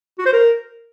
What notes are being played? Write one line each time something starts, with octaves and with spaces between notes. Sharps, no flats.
F#4
C5
A#4